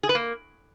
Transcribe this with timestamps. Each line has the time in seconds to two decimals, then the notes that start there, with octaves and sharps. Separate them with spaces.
0.03 G#4
0.09 B4
0.15 A#3